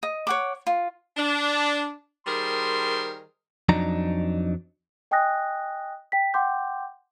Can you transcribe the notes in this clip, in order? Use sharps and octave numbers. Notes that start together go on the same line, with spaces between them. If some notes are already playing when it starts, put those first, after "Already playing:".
D#5
C#5 F#5 D6
F4
D4
D#3 G3 G#4 A#4 C5 C6
F2 F#3 D4 D#4 A#5
D#5 G5 G#5 D#6 F#6 A#6
G5 B6
F#5 G5 C6 D6 G6